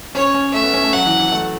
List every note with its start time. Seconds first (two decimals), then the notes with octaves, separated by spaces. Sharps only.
0.15 C#4 C#5
0.34 C#4
0.54 A3 E5
0.63 B3
0.74 C#4
0.83 A3
0.93 F#3 F#5
1.06 E3
1.19 E3
1.32 A3